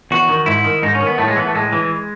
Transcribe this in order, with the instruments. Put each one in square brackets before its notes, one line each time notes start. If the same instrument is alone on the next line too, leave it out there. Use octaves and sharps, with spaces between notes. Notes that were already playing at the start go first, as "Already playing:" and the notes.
[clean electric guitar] E2 F#4
D#3
G#2 E4
D#3
G#2 D#4
C#4
D#3
B3
A2 A3
G#3
E3 B3
A3
A2 G#3
E3